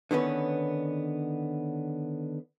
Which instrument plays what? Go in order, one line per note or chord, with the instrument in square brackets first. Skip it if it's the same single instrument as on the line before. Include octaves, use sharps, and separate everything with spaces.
[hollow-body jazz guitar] D3 D#3 B3 C#4 B4